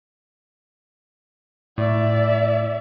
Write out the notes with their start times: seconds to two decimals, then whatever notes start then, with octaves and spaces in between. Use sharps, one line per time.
1.78 A2 D5 E5